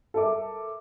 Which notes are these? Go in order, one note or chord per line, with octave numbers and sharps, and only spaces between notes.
A4 A#4 E5 D6